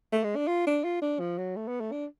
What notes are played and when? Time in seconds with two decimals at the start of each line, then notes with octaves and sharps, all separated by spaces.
0.12 A3
0.24 G#3
0.36 D4
0.48 F4
0.67 D4
0.85 F4
1.02 D4
1.20 F3
1.38 F#3
1.56 A3
1.68 B3
1.80 A3
1.92 D4